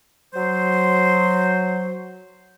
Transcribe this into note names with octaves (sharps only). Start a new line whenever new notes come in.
F#3 C5